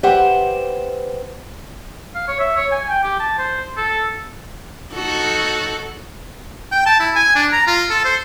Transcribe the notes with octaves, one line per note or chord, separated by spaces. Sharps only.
G4 B4 C5 E5 F#5 G5
F5
C#5
E5
C#5
G#5
G5
G4
A5
C5
A4
D#4 F#4 A4
G5
A5
E4
G#5
D4
A#5
F4
A4
C5